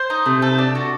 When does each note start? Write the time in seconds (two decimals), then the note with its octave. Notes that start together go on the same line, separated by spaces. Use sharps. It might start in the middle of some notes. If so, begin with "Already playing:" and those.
Already playing: C5
0.10 D#4
0.26 C3 A3
0.42 A4
0.58 D4
0.75 F#4